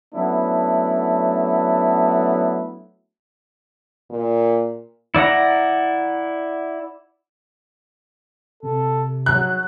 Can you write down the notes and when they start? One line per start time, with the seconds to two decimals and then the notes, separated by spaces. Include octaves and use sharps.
0.13 F#3 A3 B3 C#4 D4 E4
4.10 A#2
5.15 E4 D5 F#5 A#5
8.63 C3 A4
9.26 F#3 F#6